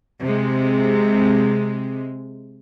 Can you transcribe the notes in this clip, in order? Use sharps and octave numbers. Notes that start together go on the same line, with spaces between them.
C3 G#3